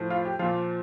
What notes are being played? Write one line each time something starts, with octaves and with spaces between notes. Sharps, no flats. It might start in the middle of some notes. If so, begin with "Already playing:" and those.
Already playing: A2 F3
F4
G4
A#2 F3 F4